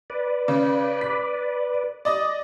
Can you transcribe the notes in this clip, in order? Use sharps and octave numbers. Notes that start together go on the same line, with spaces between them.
B4 D5
C#3
B6
D5 D#5 D#6